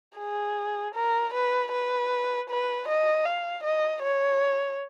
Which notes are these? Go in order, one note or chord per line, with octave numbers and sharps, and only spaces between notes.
G#4
A#4
B4
B4
B4
D#5
F5
D#5
C#5